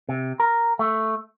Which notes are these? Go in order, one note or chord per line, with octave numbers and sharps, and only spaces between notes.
C3
A#4
A3